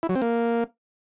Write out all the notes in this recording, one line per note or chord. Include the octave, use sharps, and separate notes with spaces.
E4
F#3
C4
A#3